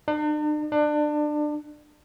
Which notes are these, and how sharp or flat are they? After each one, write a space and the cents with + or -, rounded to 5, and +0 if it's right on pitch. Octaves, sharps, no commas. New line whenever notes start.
D4 +45
D4 +25